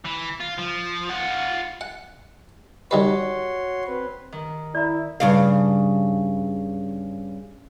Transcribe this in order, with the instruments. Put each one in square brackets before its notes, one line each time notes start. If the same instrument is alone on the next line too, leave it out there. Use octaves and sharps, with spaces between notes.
[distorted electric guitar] E3
F4
F3
F4 F#5
[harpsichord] F#5
[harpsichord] D#3 G3 B4 [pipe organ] F#4 C#5 C6
[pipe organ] C4 B4
[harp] D#3
[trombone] E4 [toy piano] D5 A#5
[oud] G2 C#3 F5